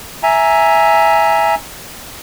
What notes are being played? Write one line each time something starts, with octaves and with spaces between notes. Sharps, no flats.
E5 G#5 A#5